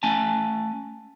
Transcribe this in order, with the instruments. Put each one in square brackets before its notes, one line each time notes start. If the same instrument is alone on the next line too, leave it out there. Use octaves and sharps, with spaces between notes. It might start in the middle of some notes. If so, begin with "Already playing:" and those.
[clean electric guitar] A3 C#4 G#5 A5